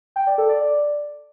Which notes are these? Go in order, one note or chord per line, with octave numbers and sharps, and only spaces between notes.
G5
D5
A4
D5